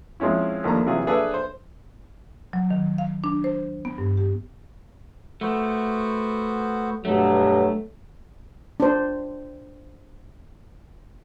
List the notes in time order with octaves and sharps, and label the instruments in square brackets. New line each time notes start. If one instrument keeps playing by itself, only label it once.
[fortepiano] F3 G#3 C4 C#4 E4
D#2 D#3 F3 A3 D4 A#5
C3 E3 F#3 F4 G#4
D4 G#4 A4 B4 D5 E5
C5
[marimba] F#3
D#3
F5
D4
C5
B3
G2
G4
[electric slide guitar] A3 [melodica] B3 F#4 C5
[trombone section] G2 B2 F#3 [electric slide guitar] A3
[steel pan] D4 C5